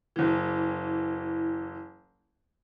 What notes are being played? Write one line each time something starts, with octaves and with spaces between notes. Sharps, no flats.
F#1 E3